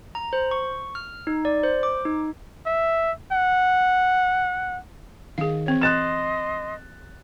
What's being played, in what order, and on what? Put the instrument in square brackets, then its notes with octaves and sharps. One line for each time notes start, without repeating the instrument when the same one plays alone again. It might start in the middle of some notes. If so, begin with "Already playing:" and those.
[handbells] A#5
C5
C#6
F6
D#4
D5
C5
D6
D#4
[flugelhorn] E5
F#5
[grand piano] D#3 [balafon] G#4 F5
[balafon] E3 C4 C#5
[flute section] D#5 C6 [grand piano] F#6 A6 E7